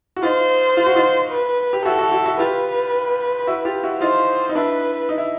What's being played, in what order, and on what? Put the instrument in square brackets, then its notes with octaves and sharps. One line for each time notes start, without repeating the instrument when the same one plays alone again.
[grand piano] F#4
[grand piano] D#4 F4 [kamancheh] C5
[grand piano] F4
F#4
D#4 F4
[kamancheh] B4
[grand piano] G4
[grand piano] E4 F#4 [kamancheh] A4
[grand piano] E4 F#4
E4 F#4
E4 F#4
[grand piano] F4 G4 [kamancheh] B4
[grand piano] E4 F#4
F4 G4
E4 F#4
[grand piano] D#4 F4 [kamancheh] C5
[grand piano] D#4
[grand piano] D4 E4 [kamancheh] B4
[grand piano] D#4
E4